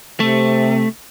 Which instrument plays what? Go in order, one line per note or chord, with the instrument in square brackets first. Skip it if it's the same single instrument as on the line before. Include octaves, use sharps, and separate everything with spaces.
[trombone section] C3 [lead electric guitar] A3